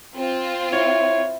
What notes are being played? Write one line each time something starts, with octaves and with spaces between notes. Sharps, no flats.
C4 F4
E4 C#5